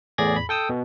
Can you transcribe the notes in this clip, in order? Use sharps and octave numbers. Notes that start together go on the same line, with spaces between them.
E2 A2 G#4 D5 G#6 A#6
B5
A4 G5 D#6 E6
B2